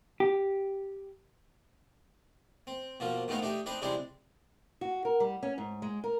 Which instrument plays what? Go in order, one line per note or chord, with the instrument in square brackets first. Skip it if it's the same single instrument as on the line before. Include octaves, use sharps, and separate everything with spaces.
[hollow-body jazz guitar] G4
[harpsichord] C4
B2 F3 A#3
G#2 D#3 A3 B3 D#4 F5
A3 D4 D#4 G4
C4 D4 D#4 B4
C3 G3 G#3 C4 D4 E4
[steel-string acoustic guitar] F#4
A#4
G3
C#4
G#2
G#3
A#4